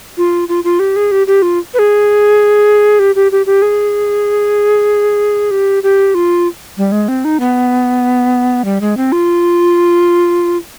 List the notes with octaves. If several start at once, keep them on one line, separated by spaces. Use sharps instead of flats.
F4
F4
F4
G4
G#4
G4
G4
F4
B4
G#4
G4
G4
G4
G4
G#4
G4
G4
F4
G3
G#3
C4
D#4
B3
G3
G#3
C4
F4